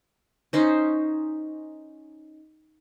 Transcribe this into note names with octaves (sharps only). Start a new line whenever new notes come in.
C#4 D#4 C5